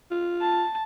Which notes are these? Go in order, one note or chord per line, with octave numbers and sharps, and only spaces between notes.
F4
A5